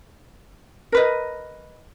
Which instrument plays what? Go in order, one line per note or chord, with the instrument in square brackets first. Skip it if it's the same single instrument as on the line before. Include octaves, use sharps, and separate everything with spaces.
[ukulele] A#4 B4 D#5